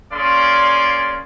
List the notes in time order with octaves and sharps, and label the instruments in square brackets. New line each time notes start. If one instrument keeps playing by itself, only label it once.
[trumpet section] A#3 C#4 G#4 D5 F5 C6